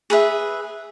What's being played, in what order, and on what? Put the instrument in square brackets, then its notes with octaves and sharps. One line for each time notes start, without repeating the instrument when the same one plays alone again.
[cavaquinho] G#4 B4 E5